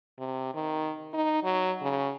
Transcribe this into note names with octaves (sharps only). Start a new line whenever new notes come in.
C3
D#3
D#4
F#3
C#3